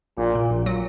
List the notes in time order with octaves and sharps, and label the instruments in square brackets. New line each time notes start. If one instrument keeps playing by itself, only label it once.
[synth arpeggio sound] A#1 [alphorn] A#2
[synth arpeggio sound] A#2
A#1
F#3